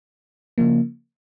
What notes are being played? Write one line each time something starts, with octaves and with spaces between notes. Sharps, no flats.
C#3 F3 A#3